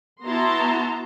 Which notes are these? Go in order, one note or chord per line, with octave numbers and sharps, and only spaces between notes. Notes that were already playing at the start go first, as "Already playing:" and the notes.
B3 E4 F#4 A5 A#5 C6